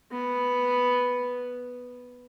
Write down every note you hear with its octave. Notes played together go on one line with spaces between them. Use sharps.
B3